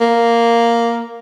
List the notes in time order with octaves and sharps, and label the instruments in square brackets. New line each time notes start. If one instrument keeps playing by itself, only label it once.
[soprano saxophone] A#3